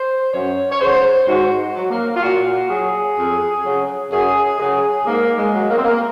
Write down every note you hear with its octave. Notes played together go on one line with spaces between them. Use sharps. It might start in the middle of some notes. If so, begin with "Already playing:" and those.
Already playing: C5
F#2 C#5
C#5
C#3 F#3 C5
G#2 F#4
F#3
A#3
F4
A#2 F#4
F#3 G#4
F2
C#3 F#3
F#2 G#4
C#3 F#3 G#4
G#2 A#3
G#3
F#3
A#3
C4
A#3